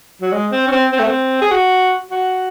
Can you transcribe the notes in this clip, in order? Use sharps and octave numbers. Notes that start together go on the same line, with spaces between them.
F#3
G#3
C4
C#4
C4
C4
A3
C4
G#4
F#4
F#4